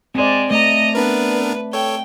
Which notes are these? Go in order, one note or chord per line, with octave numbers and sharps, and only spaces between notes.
G#3 C4 D5
A3 D#5 A#5
B3 D4 A#4 B4
A4 C#5 G5